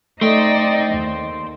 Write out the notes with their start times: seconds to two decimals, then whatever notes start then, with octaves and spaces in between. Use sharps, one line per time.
0.21 A3 D#4 C5 D5 D#5 G5
0.93 D#2